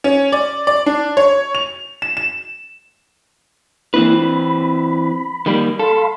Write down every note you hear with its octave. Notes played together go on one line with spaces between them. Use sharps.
C#4
D5
D5
D4
C#5
F7
E7
E7
E3 A#3 C4 D4 E4 B4
B5
D#3 G3 A#3
A4 F5 B5 C6